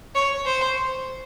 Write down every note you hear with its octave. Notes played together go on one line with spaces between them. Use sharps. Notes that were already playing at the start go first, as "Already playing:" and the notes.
C#5
C5